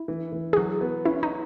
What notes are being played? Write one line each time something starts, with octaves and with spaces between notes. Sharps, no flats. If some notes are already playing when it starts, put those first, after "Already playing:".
Already playing: E4
E3
E3
G#4
F#3 F#4
B3
C#4 E4
D#4